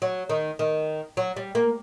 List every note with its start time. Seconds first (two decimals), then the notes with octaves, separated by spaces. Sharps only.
0.02 F#3
0.30 D#3
0.59 D#3
1.17 F#3
1.36 G3
1.55 A#3